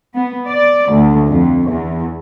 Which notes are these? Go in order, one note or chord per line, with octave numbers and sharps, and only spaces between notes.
B3
D5
D2
F2
E2